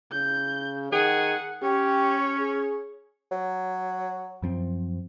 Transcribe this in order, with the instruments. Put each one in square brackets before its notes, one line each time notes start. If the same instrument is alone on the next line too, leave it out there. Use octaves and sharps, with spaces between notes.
[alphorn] C#3 [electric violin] G6
[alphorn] D#3 [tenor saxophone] G#4 [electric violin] F#5
[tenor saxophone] C#4 [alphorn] G4 [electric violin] C#5
[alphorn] G#4
[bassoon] F#3
[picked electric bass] F#2 F3 C4